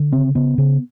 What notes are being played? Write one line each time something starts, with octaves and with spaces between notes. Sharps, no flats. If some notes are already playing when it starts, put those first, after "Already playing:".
Already playing: D3
C#3 C4
C#3 B3
C#3